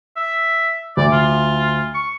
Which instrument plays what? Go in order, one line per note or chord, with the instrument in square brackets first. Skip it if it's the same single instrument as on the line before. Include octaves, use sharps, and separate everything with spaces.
[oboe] E5
[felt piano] D2 [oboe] D5
[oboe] F4
C#6